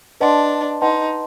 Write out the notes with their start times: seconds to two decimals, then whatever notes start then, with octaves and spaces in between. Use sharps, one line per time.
0.21 D4 B4 D#5 F#5 A5 C6
0.82 D#4 B4 D#5 F#5 A5 C6